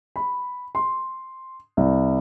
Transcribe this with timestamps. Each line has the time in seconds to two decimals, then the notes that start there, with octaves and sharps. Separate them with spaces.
0.16 B5
0.75 C6
1.77 C2